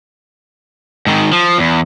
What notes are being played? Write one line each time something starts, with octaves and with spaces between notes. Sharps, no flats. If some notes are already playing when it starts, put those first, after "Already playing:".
G#2 D#3
F3
E2